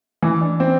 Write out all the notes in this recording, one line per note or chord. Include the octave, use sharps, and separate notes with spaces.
E3
D4
C4